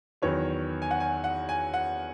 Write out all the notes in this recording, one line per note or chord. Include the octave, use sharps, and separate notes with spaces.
E2 D#3 F#3 B3 C#5
G#5
F#5
G#5
F#5
G#5
F#5